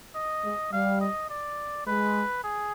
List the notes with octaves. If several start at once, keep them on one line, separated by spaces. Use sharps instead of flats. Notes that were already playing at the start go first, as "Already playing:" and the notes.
D#5
G#3
G3 F5
D#5
D5
G#3 B4
G#4